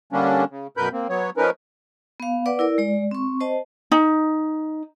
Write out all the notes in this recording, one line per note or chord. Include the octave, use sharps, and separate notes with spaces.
D3 G3 A#3 C#4 D4
C#3
F#2 B2 A#4 B4 B5 G6
A#3 C4
F#3 B3 C#5
F3 C#4 D#4 A#4 B4
B3 F5
B4 D5 F#5 D6
E4 A#4 D5
G#3 D5
C4 C#6
C5 D#5 A5
D#4